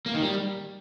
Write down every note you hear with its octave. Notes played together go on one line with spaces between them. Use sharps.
A#3
D#3
G3